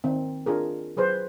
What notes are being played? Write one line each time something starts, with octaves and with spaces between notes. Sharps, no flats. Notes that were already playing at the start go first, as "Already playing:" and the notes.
D#3 C4
D4 F4 G#4 A#4
F#3 G#4 B4 C5